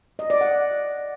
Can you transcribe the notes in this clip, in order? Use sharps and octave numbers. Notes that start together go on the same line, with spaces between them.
D#5
D5
F#5